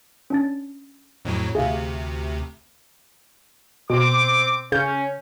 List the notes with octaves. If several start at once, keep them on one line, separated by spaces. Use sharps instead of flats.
C#4 D4 A6
F2 A2 F#3
D2 C3 G#4 E5 F5
B2 C4 D6
C#3 C#4 G6